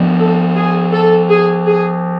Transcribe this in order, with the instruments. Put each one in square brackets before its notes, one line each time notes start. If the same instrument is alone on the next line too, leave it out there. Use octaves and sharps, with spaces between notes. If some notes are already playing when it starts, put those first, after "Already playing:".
Already playing: [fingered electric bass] F3 B3 D4
[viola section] A4
G#4
A4
G#4
G#4